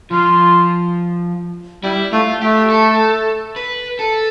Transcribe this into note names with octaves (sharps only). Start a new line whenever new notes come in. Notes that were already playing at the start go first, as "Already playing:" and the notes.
F3 F4
G3 E4
A3 F4
A3 G4
A4
B4
A4